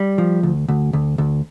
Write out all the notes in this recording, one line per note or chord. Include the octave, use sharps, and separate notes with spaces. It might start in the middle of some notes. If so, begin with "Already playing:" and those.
Already playing: G3
F3
D2
D2
D2
D2